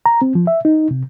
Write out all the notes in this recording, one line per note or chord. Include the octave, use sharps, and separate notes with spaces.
A#5
C4
F3
E5
D#4
C3